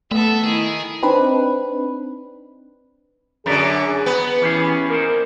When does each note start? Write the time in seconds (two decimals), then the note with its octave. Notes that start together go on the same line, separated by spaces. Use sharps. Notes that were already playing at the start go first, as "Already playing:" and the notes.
0.11 A3 B3 A4 E5
0.44 D#3 E4 G#4
1.03 C4 D4 D#4 B4
3.46 F#2 D3 G#4 B4 D5 A#5
4.06 B3
4.42 E3 C#4 G4 G#4
4.90 A#3 D#4 A#4 C5